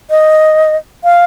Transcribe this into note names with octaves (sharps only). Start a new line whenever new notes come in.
D#5
F5